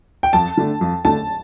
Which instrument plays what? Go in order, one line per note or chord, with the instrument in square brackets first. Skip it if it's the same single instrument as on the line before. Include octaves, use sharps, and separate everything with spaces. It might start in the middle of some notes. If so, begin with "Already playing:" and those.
[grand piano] G5
[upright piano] F2 [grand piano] A5
[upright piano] D3 A3 D4
F2
[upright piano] D3 A3 D4 [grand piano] A5